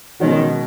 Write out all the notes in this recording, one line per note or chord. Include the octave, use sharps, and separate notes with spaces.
B2 D#3 G#3 C#4 F#4